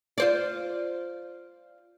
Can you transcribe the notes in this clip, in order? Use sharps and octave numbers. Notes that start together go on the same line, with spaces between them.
F4 C5 D5